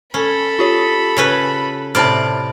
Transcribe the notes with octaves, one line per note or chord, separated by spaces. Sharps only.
C#4 A4 B5
F4 G4 C#5
C#3 C#4 B4
A2 C3 D5 A5 B5 F6